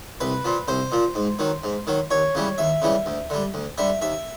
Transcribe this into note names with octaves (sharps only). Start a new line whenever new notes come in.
C2 B4
A#2 F3
C2 C5
A#2 F3
G#2
D#3 F#3
G#2
D#3 F#3
D#2 C#5
C#3 E3 G3
D#2 E5
C#3 E3 G3
D2
D3 G3
D2
D3 G3 E5
D#2 E5